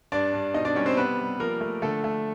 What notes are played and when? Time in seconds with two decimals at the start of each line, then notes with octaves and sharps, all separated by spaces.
0.12 G2 D4 D5
0.33 G2
0.54 B2 D#4 D#5
0.65 D4 D5
0.75 G3 C#4 C#5
0.86 C4 C5
0.96 C3 B3 B4
1.18 G3
1.40 F3 A#3 A#4
1.61 A3
1.82 D3 A3 A4
2.04 A3